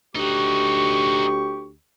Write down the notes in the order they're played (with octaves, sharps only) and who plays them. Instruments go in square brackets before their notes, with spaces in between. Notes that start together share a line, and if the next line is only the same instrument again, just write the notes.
[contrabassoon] D2 [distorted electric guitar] D#4 F#4 [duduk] G4 [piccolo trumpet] C#6